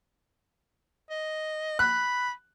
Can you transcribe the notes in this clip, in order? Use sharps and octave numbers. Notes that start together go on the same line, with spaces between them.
D#5
B5 F#6